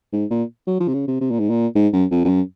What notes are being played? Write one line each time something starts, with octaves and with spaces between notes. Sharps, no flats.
G#2
A#2
F#3
F3
C3
C#3
C3
C3
A#2
G#2
A#2
G#2
F#2
F2
F2
F#2